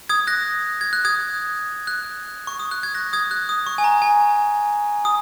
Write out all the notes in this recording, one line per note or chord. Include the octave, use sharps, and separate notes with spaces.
D#6 G#6
F#6 A#6
G#6
F#6
D#6 G#6
F#6
C#6
D#6
F#6
G#6
F#6 A#6
D#6 G#6
F#6
D#6
C#6
G#5
A#5
G#5
D#6